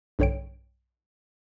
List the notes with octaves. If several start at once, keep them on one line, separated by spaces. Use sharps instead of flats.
B1 G2 D3 C#5 G5 D7